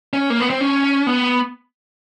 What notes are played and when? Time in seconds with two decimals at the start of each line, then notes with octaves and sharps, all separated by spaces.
0.13 C#4
0.30 A#3
0.40 B3
0.50 C4
0.60 C#4
1.07 B3